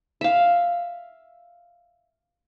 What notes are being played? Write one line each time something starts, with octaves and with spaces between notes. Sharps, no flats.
E5 F5